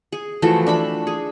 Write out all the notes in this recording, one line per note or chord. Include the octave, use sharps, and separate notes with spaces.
G#4
E3 F3 A3 F#4
D4 E5 B5
G#4